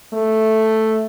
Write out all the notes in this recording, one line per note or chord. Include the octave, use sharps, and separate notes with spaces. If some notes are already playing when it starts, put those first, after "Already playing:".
A3